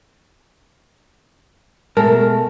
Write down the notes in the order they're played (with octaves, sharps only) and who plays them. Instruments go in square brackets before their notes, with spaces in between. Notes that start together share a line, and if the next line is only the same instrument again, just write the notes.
[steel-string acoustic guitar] B2 G#3 A3 [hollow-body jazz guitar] A#4 A5